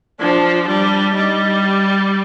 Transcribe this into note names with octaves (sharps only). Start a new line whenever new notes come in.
F3 D4
G3 D4
G3 D#4
G4